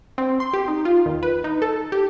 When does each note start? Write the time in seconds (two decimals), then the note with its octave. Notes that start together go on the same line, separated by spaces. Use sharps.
0.18 C4
0.40 C6
0.53 G4
0.68 D#4
0.85 F4
1.06 D#2
1.23 B4
1.44 D#4
1.62 A4
1.92 G4